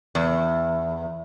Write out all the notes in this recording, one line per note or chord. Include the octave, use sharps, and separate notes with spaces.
E2